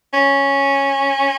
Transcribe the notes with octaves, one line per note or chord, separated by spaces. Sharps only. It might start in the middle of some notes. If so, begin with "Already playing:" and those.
C#4